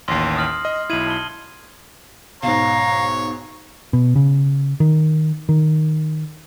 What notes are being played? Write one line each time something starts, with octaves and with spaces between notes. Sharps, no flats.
A1 D#2 C6 A#6 C7
D#6 F6 F#7
D#5
B1 E4 G#6 D#7 F#7
A5 G7
B1 G#2 C#5 F5 A#5
B2
C#3
D#3
D#3